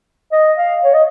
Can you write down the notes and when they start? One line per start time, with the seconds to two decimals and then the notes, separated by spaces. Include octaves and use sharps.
0.32 D#5
0.57 F5
0.84 C#5
0.93 D#5